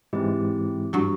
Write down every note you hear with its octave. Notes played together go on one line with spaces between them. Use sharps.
G#2 E3 G#3 C4 E4 G4
G2 F#3